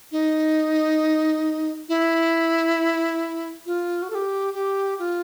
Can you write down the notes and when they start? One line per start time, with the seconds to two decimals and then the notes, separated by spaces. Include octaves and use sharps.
0.12 D#4
1.89 E4
3.66 F4
4.02 F#4
4.10 A4
4.15 G4
4.54 G4
4.99 F4